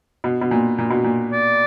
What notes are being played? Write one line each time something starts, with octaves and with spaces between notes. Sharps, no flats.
B2
B2
A#2
A#2
B2
A#2
D5